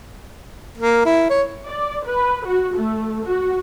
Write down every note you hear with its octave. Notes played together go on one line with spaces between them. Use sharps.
A#3
E4
C#5
D5
B4
F#4
A3
F#4